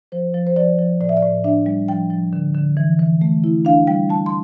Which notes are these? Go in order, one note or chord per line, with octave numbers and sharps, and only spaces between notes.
F3 C5
F3
C5
F3 D5
F3
A2 D5
E5
D5
A2
D4 E5
G3
F3 G5
F3
D3
D3
E3
E3
A3
E4
D4 F5
G3 G5
G3 A5
C6